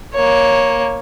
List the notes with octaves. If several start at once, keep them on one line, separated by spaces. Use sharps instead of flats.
A#3 C#5